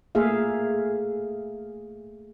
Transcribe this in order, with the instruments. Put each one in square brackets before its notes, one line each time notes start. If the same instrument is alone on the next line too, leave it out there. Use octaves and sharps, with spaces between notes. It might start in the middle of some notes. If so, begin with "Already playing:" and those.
[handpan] A3 A#3 G#4 E5 F5